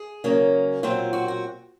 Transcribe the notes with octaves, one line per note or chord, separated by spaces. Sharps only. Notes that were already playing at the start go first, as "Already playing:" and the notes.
Already playing: G#4
C#3 F#3 A#3 C#4
A#2 F#3 C4 F4
F#4
F#4